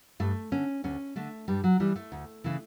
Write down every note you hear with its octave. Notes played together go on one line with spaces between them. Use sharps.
G2 A3
D3 C#4
D2 C#4
D3 A3
G2 G3
F#3
E3 G3
A3
D2
C#3 E3